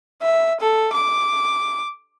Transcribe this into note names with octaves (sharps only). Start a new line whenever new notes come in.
E5
A4
D6